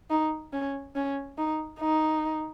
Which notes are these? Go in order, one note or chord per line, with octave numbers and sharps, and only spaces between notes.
D#4
C#4
C#4
D#4
D#4